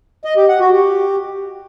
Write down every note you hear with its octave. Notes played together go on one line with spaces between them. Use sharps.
D#5
G4
F#5
F#4
G4